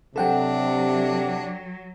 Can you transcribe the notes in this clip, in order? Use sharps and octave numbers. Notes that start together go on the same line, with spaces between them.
C3 F#3 D4 A4 F#5 G5